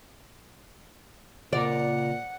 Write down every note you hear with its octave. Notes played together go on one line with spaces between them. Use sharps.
A#2 C#3 F4 A#4 D5 F#5